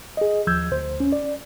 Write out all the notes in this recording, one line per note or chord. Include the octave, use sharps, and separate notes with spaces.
G#4 D#5
D#2 F3 E6 G6 G#6
D2 C5
C#4
D5